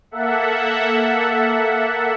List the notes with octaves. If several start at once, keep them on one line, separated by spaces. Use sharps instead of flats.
A#3 A4 E5 F#5